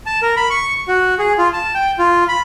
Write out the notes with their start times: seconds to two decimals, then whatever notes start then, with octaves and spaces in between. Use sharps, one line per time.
0.06 A5
0.22 A#4
0.37 B5
0.50 C#6
0.88 F#4
1.19 G#4
1.38 F4
1.53 A5
1.75 G5
1.99 F4
2.28 B5